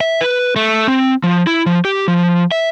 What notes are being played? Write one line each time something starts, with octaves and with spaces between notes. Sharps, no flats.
E5
B4
A3
C4
F3
E4
F3
G4
F3
E5